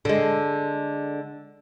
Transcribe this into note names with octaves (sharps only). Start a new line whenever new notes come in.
D3 G#3